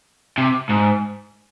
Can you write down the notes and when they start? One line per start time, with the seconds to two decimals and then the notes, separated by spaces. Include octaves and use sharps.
0.38 C3
0.69 G#2